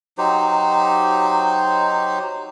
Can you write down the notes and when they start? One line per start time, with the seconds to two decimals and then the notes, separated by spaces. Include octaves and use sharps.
0.18 F#3 D#4 G4 C5